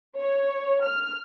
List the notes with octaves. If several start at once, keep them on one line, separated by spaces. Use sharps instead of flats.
C#5
F6